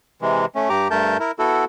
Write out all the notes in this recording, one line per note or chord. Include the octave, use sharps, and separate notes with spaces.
C3 E3 G#3
A3 C#4
G2 G4 A#5 D6
G2 A3 A#4 A5 G6
E4 A#4
B3 E4 F#4 A4